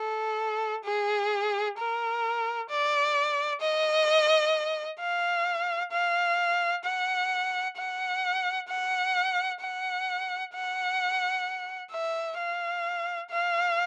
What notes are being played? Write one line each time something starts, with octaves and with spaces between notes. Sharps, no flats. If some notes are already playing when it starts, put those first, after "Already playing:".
Already playing: A4
G#4
A#4
D5
D#5
F5
F5
F#5
F#5
F#5
F#5
F#5
E5
F5
F5